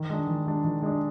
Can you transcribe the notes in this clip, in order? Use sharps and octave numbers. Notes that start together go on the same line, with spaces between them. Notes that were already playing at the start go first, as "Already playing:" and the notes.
Already playing: D#3
G#3 D4
D#3
G#3 D4
D#3
G#3 D4